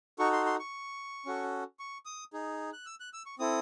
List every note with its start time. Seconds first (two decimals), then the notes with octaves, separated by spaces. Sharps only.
0.19 D#4 F#4 A4 C#6
0.33 C6
0.46 C6
0.59 C#6
1.26 C#4 F#4 A4
1.79 C#6
2.06 D#6
2.33 D#4 G#4
2.73 F#6
2.86 E6
3.00 F#6
3.13 E6
3.26 C#6
3.39 C4 E4 A4 D#6